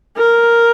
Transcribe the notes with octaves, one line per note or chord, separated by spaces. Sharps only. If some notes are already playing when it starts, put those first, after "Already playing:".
A#4